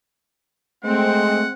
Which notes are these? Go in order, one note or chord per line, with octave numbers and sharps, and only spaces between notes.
G#3 A3 C4 F#5